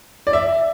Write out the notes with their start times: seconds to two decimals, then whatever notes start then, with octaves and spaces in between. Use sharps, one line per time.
0.27 D5
0.33 E5